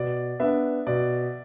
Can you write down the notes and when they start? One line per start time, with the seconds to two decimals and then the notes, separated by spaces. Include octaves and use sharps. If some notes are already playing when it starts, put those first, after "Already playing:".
Already playing: B2 D5
0.40 B3 D4 E5
0.87 B2 D5